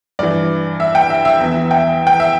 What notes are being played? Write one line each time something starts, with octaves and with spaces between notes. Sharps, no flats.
G2 E3 D5
E5
G5
E5
E5
E2 E3
G5
G5
E5